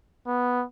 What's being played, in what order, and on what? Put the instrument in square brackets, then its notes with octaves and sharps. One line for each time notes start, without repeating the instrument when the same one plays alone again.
[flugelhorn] B3